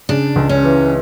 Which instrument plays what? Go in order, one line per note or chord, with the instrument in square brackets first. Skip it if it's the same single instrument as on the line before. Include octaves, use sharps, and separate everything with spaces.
[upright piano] C#3 [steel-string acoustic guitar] D4
[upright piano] C#2
[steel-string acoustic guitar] C#4
[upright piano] E3